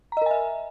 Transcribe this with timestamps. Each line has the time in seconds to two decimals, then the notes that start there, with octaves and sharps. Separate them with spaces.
0.12 A#5
0.17 D#5
0.22 A#4
0.26 G#5
0.31 E5